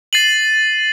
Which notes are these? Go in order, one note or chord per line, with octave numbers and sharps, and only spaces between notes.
A6 C7 D#7 F#7